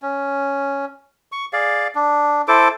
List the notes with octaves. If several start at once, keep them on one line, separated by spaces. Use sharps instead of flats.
C#4
C#6
G#4 D5 F5
D4
E4 A4 C5 D6